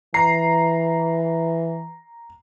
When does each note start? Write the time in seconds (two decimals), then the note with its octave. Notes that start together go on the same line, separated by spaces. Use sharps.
0.14 E3 A#5 C7